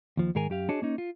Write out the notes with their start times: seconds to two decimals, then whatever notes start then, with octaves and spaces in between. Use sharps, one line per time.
0.17 D#2 F3
0.35 G#2 D#3 G#4 A#4 G#5
0.50 F#2 G4 F5
0.69 D4 F#4 G#4 C#5 D#5 A5
0.82 A#3 C#4 D#4
0.98 F4